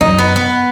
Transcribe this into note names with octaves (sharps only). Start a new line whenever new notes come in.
F#2 D#4
B3
B3